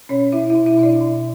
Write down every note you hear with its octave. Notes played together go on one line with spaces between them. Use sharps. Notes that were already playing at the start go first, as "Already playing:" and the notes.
B2 C#4 C#5
B2 E4 E5
E4 E5
B2
E4 E5
B2 E5
D4 D5
B2